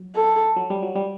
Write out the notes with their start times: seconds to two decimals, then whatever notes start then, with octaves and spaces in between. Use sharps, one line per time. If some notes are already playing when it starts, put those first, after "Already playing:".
Already playing: F#3
0.15 A4
0.56 F#3
0.70 G3
0.83 F#3
0.96 G3